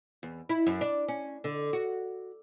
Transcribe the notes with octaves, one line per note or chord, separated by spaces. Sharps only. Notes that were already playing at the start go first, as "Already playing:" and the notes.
E2
E4
F#2
D4
C#4
D3
F#4